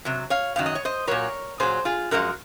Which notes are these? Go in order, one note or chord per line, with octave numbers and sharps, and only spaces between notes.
C3 F#3
C#5 F5
F#2 D#3 F#3 F5
D#5
C#5
C5 D#5
A#2 F#3 A#4 C#5
A#2 F#3 G#4 C5
F4 G#4
F#2 F3 G#3 F#4 A#4